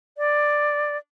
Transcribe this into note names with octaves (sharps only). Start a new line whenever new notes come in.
D5